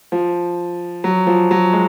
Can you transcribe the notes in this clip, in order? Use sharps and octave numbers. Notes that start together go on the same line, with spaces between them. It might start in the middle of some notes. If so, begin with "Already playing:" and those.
F3
F#3
F3
F#3
G#3